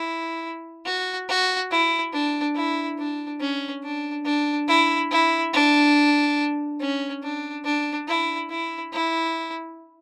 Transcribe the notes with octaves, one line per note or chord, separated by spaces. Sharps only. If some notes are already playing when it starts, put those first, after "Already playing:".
Already playing: E4
F#4
F#4
E4
D4
E4
D4
C#4
D4
D4
E4
E4
D4
C#4
D4
D4
E4
E4
E4